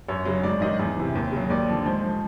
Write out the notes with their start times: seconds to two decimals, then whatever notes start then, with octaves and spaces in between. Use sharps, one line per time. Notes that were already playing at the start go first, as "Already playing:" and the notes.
0.08 F#2 C#5
0.25 C#3 F#3
0.43 G#2 D5
0.61 D#3 F#3 D#5
0.79 E2
0.97 C3 E3
1.15 D#2
1.32 C#3 F#3
1.50 D#2 D5
1.68 D3 F3
1.86 G#2 C5
2.03 F3